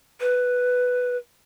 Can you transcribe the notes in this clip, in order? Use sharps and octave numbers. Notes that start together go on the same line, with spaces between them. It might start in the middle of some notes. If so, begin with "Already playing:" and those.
B4